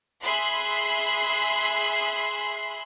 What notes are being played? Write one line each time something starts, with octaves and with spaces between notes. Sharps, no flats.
G#4 E5 B5 C6 F#6 C7